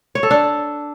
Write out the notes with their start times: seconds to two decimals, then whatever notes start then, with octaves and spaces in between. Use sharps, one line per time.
0.15 C#5
0.23 A4
0.31 D4